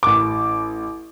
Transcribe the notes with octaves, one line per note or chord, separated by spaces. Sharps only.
A1 D6